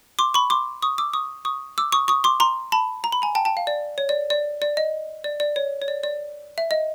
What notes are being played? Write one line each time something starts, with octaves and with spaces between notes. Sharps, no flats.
C6 D6
B5 C#6
C6 D6
C#6 D#6
D6 E6
C#6 D#6
C#6 D#6
D6 E6
C#6 D#6
C#6 D#6
C6 D6
A#5 C6
A5 B5
A#5
B5
G#5 A#5
G5 A5
G5 A5
F5
D5
C#5
D5
D5
D5
D#5
D5
D5
C#5
C#5
D5
D5
E5
D#5